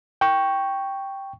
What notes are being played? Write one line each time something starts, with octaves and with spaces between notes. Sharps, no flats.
G5 C#6